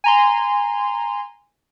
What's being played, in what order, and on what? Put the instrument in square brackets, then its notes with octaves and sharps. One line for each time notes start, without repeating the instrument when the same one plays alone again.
[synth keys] G#5 A#5 C6